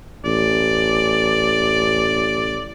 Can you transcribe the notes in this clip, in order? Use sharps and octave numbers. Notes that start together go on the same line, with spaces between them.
A1 D5